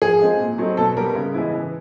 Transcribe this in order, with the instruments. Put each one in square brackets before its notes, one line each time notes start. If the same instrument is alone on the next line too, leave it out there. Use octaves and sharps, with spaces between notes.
[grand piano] F3 [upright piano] G#4
[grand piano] G#3 C4
A#2
F#3 A3 C4 D#4
[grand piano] B2 [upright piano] A4
[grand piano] G3 B3 [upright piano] A#4
[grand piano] C#3
E3 G#3 B3 E4
E3